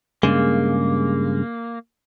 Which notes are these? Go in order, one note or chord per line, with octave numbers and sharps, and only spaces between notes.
G2 C#3 G#3 A#3